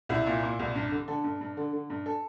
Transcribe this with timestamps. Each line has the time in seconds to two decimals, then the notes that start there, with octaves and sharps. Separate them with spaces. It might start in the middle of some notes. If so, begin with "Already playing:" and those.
0.09 C2 E4
0.26 A#2
0.43 A#2
0.59 C2
0.75 G2
0.92 D3
1.08 D3 A4
1.24 G2
1.41 G2
1.57 D3
1.73 D3
1.90 G2
2.06 A4